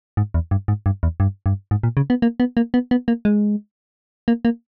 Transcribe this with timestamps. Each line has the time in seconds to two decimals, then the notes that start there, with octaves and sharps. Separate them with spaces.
0.17 G#2
0.34 E2
0.51 G2
0.68 G#2
0.86 G2
1.03 E2
1.20 G2
1.46 G2
1.71 G#2
1.83 A#2
1.97 C#3
2.10 B3
2.22 A#3
2.40 B3
2.57 A#3
2.74 B3
2.91 B3
3.08 A#3
3.25 G#3
4.28 A#3
4.45 A#3